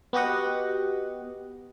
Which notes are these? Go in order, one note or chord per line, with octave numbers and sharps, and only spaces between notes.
B3 F#4 G4 D#5 F#5